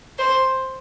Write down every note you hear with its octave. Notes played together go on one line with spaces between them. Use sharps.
C5